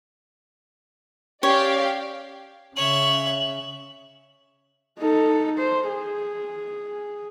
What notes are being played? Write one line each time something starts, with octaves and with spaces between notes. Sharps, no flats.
C#4 G4 C#5 D5 F5
C#3 C#5 E5 F#7
D#4 A4
C5
G#4